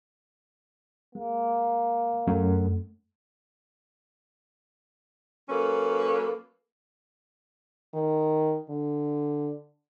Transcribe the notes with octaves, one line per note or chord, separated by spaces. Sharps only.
G#3 A#3
F#2 A3
F#3 A#3 C#4 A4 B4
D#3
D3